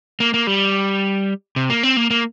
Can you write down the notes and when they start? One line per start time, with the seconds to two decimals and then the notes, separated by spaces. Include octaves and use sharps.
0.20 A#3
0.34 A#3
0.47 G3
1.56 C3
1.70 A#3
1.83 C4
1.97 A#3
2.11 A#3